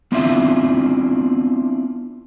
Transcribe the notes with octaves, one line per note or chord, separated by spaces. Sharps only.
B3 C4 D4 E4 F4 E5